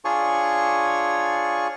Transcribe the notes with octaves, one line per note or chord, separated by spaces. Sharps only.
D4 F4 G#4 C#5 G#5 C#6